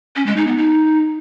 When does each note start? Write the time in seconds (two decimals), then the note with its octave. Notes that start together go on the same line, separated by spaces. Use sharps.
0.16 C#4
0.26 G#3
0.37 D#4
0.47 B3
0.57 D#4